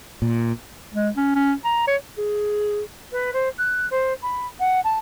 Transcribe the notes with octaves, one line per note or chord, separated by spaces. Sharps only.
A#2
G#3
C#4
C#4
A#5
C#5
G#4
B4
C5
F#6
C5
B5
F#5
A5